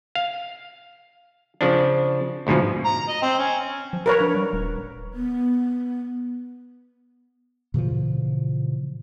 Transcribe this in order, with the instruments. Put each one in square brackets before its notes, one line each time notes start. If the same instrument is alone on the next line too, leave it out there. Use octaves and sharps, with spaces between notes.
[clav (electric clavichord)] F5
C#3 F3 D4
D2 G#2 B2 F3
[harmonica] A#5
D#5
C4
C#4
[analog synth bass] F3
[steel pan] A#4 B4 C#5
[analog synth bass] D4
G3
D#1
[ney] B3
[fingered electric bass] A#2 C#3 E3 F3